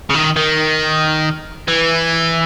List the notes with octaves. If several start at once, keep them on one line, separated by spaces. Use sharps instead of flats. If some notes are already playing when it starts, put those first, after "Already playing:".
C#3
D#3
D#3
E3